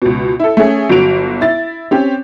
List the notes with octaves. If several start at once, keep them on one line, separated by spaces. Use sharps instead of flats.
C#2 B2
E4 A4
A3 C#4 G#4
G1 F#3 F#4 D7 F7
E4 A6
C4 C#4 G4